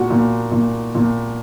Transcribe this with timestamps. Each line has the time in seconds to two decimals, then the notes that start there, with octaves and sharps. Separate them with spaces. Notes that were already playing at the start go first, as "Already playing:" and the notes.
Already playing: A#2 F#4
0.10 A#2
0.51 A#2
0.95 A#2